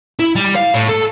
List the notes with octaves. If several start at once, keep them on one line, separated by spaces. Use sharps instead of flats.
E4
G3
F5
A2
A4